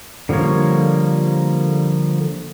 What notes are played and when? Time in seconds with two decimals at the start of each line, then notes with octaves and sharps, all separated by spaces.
0.29 D3 F3 G3 A#3 C#5